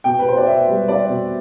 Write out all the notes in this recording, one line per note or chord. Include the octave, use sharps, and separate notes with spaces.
B2 G5
B4
B2 C5
D5
B2 E5
G3
B3 D5
B2